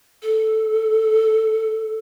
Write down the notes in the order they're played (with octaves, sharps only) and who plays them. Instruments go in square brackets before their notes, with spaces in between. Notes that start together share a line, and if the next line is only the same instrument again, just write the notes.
[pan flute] A4